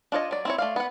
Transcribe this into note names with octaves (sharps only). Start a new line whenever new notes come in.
D4 F4 C#5 D#5
F#3 D5
C4 E4 C#5
A3 D5 F5
B3 F#5